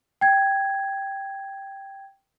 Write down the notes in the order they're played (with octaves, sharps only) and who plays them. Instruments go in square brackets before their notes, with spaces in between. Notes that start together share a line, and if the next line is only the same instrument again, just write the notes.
[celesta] G5 G#6